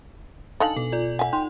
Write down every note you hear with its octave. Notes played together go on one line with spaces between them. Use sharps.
D3 D#4 F5 G#5 A5 F#7
B2 A4
F4 D5
E5 F#5 G#5
D#4 G5 C6